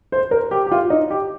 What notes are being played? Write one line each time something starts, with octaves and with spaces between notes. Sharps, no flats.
C5
A#4
G4
G4
F4
D#4
G4